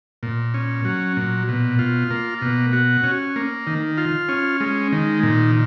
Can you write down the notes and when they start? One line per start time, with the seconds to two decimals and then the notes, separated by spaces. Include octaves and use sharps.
0.23 A#2
0.54 C#4
0.85 F#3
1.17 A#2
1.48 B2
1.79 F4
2.11 A#3
2.42 B2
2.73 F#4
3.04 C#4
3.36 A#3
3.67 D#3
3.98 F4
4.29 C#4
4.61 G#3
4.92 D#3
5.23 A#2